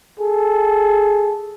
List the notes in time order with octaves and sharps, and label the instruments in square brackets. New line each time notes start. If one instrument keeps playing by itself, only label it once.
[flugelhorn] G#4 [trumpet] A4